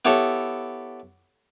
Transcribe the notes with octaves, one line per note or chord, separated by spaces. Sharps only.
B3 E4 G4 A4 C#5